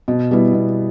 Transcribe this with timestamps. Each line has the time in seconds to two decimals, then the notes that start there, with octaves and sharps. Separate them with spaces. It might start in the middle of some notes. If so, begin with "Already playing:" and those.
0.08 B2
0.31 G3 B3 E4
0.54 B2